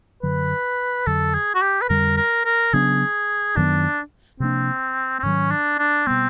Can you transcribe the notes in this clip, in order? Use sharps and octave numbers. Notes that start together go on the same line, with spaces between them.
F#2 D3 F#3 B4
F2 D3 F#3 A4
G#4
F#4
G4
B4
F2 D3 G3 A#4
A#4
A#4
C#3 F#3 B3 D4 G#4
F#2 D#3 F#3 B3 D4
C3 F3 A#3 C4 D4
C4
G#2 D#3 F#3 C#4
D4
D4
B2 G3 B3 C4